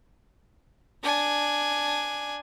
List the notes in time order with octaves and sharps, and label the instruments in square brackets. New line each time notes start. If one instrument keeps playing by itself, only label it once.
[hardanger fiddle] D4 G#5